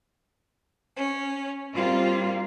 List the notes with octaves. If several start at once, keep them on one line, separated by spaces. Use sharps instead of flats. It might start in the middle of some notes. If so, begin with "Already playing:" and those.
C#4
G3 A#3 C4 F4